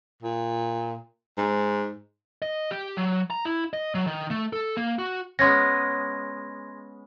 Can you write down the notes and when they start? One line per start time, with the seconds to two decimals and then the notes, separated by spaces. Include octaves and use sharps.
0.22 A#2
1.37 G#2
2.42 D#5
2.71 G4
2.97 F#3
3.30 A#5
3.45 E4
3.73 D#5
3.95 F#3
4.07 D#3
4.30 A3
4.53 A4
4.77 A#3
4.99 F#4
5.39 G#3 B3 C#4 C6 G#6 A#6